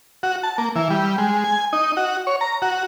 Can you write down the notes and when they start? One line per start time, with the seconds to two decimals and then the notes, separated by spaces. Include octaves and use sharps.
0.23 F#4
0.43 A5
0.58 A#3
0.76 E3
0.90 G3
1.18 G#3
1.44 G#5
1.73 D#4
1.97 F#4
2.27 C#5
2.41 A#5
2.62 F#4